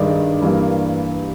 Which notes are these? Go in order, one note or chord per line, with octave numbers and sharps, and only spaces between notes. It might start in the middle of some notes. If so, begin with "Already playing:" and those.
Already playing: G2 D#3 G#3 D5
G2 E3 G3 A#3